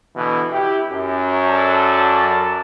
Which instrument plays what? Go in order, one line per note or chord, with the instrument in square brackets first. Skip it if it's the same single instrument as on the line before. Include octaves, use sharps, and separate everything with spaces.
[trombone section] B2 D3 E3
E4 G4
F#2
[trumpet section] A4 D5 A5